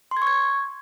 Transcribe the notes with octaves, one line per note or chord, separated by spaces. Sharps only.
C6
G#6
C#6
G#6